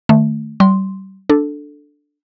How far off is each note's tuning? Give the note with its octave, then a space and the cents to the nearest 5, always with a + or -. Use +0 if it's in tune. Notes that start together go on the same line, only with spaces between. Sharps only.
D#3 -30 A3 +0
G3 -35 C6 +0
D4 +0 A4 +0